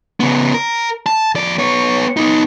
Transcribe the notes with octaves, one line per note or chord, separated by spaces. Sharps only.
C#3 B3
A#4
A5
F2 D5
B3 C#5
B3 D#4